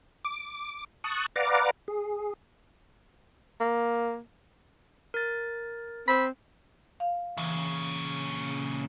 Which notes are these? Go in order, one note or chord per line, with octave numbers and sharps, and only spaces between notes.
D6
A5 C#6 D#6 F#6
B4 D5 F5 F#5 A#5 D6
G#4
A#3
A#4 A6
C4 B5
F5
A#2 C#3 E3